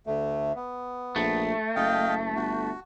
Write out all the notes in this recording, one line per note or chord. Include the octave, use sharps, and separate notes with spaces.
D2 A3
B3
A#1 A3
F#1 D#5 F5 G5
G1 F#4